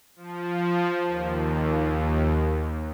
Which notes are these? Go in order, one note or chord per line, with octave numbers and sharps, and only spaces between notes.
F3
D#2